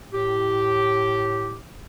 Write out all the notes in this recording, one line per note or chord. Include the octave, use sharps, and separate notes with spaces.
A2 G4